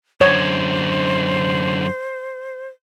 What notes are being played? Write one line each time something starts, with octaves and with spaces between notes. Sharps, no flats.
F#2 D3 C5 C#5